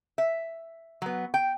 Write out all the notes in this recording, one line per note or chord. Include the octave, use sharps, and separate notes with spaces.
E5
F#3 B3
G5